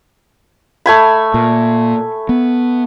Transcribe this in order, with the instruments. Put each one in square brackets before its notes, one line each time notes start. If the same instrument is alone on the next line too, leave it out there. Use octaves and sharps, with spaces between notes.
[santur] A3 G#5 B5
[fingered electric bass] A#2
B3